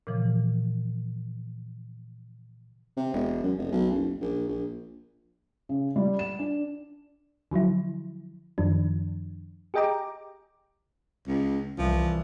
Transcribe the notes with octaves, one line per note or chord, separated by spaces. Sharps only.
A#2 C#3 E3 F3
C3
E1
F#2
F1
B1
F#1
A#1
A#1
C#3
G3
E7
D4
D3 F3 F#3 E4
F#2 D#3 F3 D4
G4 G#4 D#5 G5 A#5 D6
C#2
C2 E3 F3